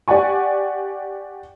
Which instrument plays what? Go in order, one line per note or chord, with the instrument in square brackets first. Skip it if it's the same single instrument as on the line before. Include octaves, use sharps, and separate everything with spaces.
[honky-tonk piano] G4 D5 F#5 G#5 C#6